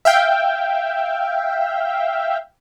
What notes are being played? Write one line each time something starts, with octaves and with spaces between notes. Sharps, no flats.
E5 F5 G5